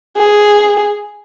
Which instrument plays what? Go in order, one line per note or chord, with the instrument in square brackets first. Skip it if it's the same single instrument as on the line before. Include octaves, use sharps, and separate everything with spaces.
[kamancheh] G#4